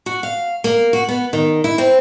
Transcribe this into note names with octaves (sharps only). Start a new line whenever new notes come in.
F#4
F5
A#3
F#4
B3
D#3
E4
C4